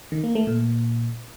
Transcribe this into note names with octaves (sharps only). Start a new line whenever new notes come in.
D#3
A#3
A3
A#2